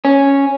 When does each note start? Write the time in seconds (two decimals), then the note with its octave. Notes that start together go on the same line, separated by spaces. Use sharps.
0.05 C#4